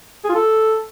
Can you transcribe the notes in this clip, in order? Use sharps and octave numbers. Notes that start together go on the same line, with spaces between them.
G#4
F4
A4